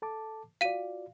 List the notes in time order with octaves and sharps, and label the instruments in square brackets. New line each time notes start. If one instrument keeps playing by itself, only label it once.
[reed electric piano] A4 A5 D6
[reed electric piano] F4 F#4 D5 [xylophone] F5 D#7